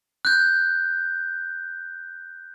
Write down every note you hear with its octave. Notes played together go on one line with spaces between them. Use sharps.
F#6 G6